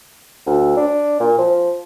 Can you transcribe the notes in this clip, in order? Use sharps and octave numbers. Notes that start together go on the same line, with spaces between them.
D2
D4
A#2
F3